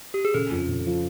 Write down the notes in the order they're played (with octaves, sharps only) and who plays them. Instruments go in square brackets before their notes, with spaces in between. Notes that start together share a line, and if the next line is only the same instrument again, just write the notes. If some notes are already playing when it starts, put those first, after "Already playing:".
[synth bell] G4
G#4
[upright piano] C#3 [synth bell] A4
[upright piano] F2
C#3
F3